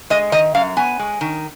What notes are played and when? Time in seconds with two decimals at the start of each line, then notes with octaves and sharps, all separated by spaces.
0.10 G#3 D#5
0.32 D#3 D#5
0.55 F#2 F5
0.77 B3 G#5
0.99 G#3
1.21 D#3